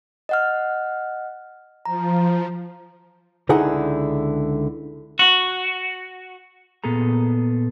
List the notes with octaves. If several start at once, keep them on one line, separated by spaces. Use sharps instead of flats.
D#5 F#5 F6
F3 A#5
C#2 D3 D#4 E4 G#4 F#5
F#4
A#2 B3 G#4 A4 A#5